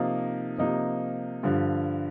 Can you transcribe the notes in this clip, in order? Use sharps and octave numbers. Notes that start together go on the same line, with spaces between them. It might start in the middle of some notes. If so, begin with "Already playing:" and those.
Already playing: C3 F3 A#3 D#4
C3 F3 A#3 D#4
G2 D3 F3